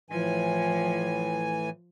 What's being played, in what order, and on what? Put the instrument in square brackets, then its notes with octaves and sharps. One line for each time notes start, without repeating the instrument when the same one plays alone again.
[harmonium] A2 E3 G#5 [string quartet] F3